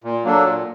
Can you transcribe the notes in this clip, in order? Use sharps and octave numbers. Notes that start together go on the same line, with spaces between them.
A#2
F#3 A#3 D4 A4
A#2